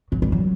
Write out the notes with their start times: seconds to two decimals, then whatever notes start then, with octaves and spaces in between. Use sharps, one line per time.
0.12 F#3
0.22 G3
0.32 F#3